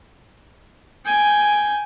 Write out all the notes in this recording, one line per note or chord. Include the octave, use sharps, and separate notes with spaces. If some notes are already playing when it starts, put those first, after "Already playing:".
G5 G#5